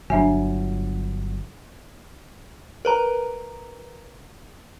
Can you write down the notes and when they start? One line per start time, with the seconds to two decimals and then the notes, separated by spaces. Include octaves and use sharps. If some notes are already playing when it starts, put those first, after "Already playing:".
0.10 G1 F#3 D4 E5 G#5
2.85 A#4 B4 A#5